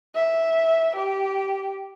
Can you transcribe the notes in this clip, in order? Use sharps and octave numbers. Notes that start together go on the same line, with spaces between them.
E5
G4